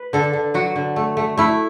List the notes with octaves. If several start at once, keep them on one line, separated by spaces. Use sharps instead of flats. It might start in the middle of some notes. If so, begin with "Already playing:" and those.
Already playing: B4
D3 A4
D3
F#3 F#4
D3
A3
A3
A3 E4